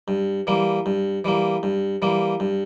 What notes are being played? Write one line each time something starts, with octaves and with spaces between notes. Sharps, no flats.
G2
E3 G3 A#3
G2
E3 G3 A#3
G2
E3 G3 A#3
G2